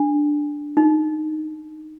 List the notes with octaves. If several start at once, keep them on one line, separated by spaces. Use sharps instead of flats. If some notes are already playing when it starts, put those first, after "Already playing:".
Already playing: D4
D#4